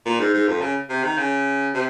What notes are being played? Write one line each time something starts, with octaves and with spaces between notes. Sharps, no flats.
A#2
G#2
G#2
F2
C#3
C3
D#3
C#3
C3